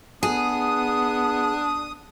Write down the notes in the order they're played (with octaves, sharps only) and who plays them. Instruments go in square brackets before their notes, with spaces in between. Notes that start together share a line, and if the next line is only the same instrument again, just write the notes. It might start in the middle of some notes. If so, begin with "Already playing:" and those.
[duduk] B3 [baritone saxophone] D4 [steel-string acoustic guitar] G#4 [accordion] D#6